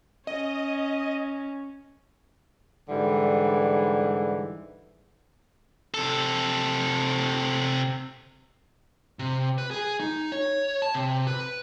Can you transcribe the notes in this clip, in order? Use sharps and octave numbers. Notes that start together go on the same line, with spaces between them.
C#4 D#5
G#2 D3 E3 G3
C3 A4
C3
B4
G#4
D#4
C#5
A5
C3
B4